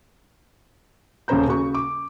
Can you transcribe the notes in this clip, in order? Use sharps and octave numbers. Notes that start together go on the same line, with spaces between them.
D#1 C#3 C#4 C5 A#5 G6
C#3 F#4 C#6
D6